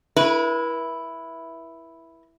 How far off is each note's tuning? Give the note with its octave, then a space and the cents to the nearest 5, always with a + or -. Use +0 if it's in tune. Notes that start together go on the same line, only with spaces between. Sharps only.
E4 +0 B4 -45